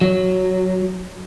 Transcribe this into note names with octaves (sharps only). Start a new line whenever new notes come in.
F#3